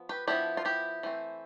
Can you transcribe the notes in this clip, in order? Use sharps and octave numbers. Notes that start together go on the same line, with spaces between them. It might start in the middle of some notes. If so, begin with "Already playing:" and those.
Already playing: F3 B3
G4 B4
F3 B3 D4 E4 G4
F4
E4 G4
E3 A3 C4